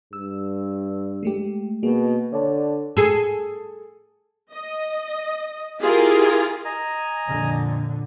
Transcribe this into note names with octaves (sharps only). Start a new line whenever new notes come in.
G2 E6
G#3 A3 G4
B2 A#3 G#4
D3 C#5 D5 A5
G#4 A4
D#5
E4 F4 G4 G#4 A#4
D#5 G#5 A#5
F2 A#2 D3